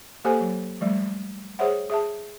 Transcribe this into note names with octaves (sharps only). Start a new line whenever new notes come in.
A#3 G4 A4 C5 G#5
F#3
F3 G3 A3
G#4 C5 C#5 E5 F#5
G#4 E5 A5